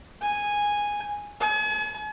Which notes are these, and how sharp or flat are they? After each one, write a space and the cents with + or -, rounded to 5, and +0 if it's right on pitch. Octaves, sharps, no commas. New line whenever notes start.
G#5 -10
G#5 +40